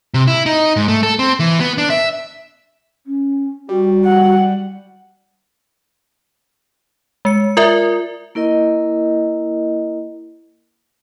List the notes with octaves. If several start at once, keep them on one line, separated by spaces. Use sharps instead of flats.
C3
E4
D#4
G#2
A3
A4
C4
E3
B3
D4
E5
C#4
G3 F#4
F#5
G#3 C#7
F4 A#4 D5 E5
A#3 E4 A#4 D#5